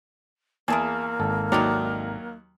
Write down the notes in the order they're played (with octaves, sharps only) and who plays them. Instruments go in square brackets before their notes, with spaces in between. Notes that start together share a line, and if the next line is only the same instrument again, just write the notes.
[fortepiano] E2 [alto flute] A#3 [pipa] E4 G#4 A5 [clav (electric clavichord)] G#5
[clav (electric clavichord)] G#1 A4
[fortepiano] D#2 F#3 A#5 [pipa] D#4 E4 D5